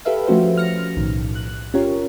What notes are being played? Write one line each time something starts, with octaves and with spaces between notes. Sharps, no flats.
G4 A4 B4 E5 F5
F3 A3 C#4 F#4 G4 C5
F6 A#6 C#7
B1 A2 D#3
F#6
C#4 F4 G4 A#4 C#5